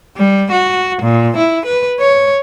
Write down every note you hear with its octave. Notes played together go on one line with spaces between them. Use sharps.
G3
F#4
A#2
E4
B4
C#5